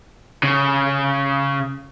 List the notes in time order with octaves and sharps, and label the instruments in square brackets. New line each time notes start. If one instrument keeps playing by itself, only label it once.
[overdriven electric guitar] C#3